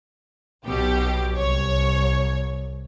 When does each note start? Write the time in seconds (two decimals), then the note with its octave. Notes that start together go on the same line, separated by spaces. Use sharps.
0.65 B1 B2 G4
1.37 C2 C#5